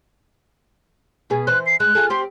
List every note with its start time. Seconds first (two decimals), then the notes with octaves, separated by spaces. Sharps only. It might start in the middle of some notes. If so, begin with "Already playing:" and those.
1.30 B2 B3 G#4
1.47 E3 C5 F#6
1.66 C7
1.80 G#3 F#6
1.95 F4 G#4 A4
2.10 C4 G4 C6